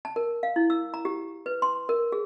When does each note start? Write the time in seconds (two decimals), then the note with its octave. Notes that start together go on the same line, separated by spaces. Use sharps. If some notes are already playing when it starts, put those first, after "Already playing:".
0.05 A5
0.16 A#4
0.43 F5
0.56 E4
0.70 E6
0.94 A#5
1.05 G4
1.46 B4
1.62 C6
1.89 A#4
2.12 G#4